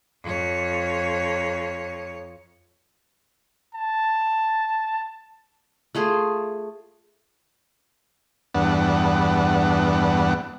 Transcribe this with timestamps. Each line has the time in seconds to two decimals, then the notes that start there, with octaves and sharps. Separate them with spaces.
0.23 F2 C#5
3.75 A5
5.95 A3 F4 G#4
8.55 E2 G2 B3 D4 F#5